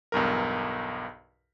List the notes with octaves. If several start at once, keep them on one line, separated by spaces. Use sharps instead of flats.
B1 E2 G2 A#4